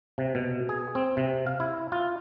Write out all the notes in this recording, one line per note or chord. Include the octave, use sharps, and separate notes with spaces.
C3
B2
G#4
C4
C3
F5
E4
F4